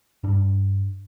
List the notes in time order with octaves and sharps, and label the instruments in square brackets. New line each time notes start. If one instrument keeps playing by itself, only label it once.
[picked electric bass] G2 D4